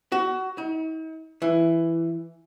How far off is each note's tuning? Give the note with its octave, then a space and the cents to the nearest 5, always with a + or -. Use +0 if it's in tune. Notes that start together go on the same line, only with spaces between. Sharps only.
F#4 +20
D#4 +45
E3 +10